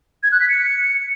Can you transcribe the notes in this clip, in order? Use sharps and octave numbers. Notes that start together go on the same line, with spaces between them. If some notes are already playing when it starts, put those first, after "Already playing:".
G#6
F#6
B6
C#7